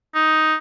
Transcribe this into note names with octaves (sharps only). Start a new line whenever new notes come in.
D#4